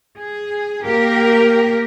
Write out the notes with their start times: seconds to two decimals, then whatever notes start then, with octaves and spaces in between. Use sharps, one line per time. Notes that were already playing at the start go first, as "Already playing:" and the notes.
0.18 G#4
0.84 A#3 G4 A#4